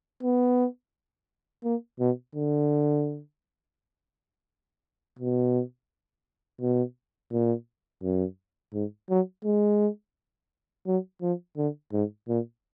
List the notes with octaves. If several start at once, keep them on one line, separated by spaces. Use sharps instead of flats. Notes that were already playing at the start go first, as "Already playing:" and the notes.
B3
A#3
B2
D3
B2
B2
A#2
F#2
G#2
F#3
G#3
F#3
F3
D3
G#2
A#2